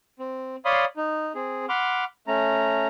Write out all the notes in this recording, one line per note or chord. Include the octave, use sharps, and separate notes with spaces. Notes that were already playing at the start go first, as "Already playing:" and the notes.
C4
C#5 D5 F5 B5 C6 D#6
D#4
C4 G#4
F#5 B5 C6 D6 F6
A3 C#4 A#5